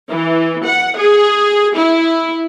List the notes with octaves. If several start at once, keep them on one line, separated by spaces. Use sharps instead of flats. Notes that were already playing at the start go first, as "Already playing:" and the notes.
E3
F#5
G#4
E4